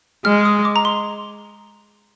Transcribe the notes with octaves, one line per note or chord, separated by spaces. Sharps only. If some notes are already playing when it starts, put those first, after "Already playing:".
G#3 F6
D#6
D6
A#5
C6